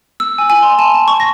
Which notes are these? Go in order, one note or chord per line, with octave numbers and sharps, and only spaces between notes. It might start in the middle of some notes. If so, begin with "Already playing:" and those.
E6
G#5
G#5
C6
A5
A5
C#6
A#6